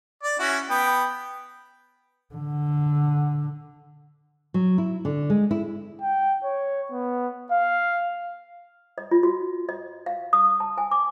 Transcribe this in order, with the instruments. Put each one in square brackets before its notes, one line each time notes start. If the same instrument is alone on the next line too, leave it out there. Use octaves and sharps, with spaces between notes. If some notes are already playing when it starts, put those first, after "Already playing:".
[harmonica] D5
C#4 E4 F#4
B3 G5
[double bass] D3
[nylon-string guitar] F#3
E4
D3
G#3
E4
[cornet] G5
C#5
B3
F5
[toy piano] D#5
F4
F#4
D#5
F5
D#6
A5
G#5
D6